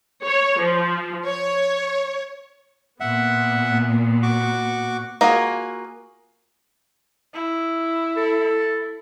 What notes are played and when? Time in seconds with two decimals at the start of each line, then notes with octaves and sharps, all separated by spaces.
0.25 C#5
0.61 F3
1.27 C#5
3.00 A#2 B3 E5 F#5
4.23 F#4 C#6 D6
5.21 A#3 F4 F#4 G#4
7.34 E4
8.17 A4